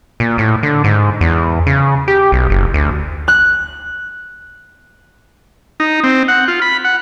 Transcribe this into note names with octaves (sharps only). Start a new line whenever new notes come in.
A#2
A2
D3
G#2
E2
C#3
G4
B1
F#1
D2
F#6
D#4
C4
F#5
F4
B5
F#5